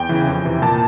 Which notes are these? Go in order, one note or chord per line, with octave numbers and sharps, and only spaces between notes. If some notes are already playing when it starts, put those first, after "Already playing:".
Already playing: E2 G5
C#3 E3
F2
C3 E3
A#2 A5